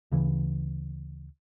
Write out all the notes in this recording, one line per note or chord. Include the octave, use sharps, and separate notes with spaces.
D2 C#3 E3